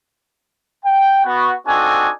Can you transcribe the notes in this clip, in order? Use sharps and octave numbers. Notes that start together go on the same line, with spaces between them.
G5
B3 F#4
C4 D4 D#4 F#4 A4 G#5